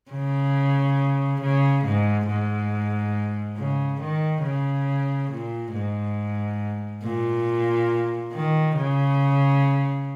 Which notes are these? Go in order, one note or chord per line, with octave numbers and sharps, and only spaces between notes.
C#3
C#3
G#2
G#2
C#3
D#3
C#3
A#2
G#2
A#2
D#3
C#3